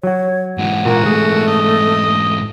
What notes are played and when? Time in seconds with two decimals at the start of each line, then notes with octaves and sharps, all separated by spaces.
0.03 F#3 F#4 C#5
0.58 G#2 E3 F#5
0.85 A#2 A#3 F#4 A#4
1.06 A3 G#4
1.47 D#5